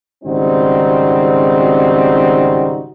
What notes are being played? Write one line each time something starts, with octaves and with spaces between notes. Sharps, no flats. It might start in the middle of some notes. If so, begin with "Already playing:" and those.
G#1 C#3 G3 C4 D#4 F#4